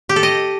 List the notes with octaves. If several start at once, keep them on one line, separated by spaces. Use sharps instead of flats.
G4
A4
D#5